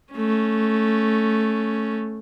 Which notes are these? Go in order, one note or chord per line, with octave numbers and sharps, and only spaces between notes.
A3 C#4